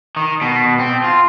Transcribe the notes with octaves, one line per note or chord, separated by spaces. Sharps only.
D#3
B2
C4
F4